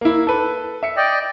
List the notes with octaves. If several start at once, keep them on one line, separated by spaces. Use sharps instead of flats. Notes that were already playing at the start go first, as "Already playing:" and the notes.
A#3 E4
A4 B4
E5 C#7
D5 D#5 G5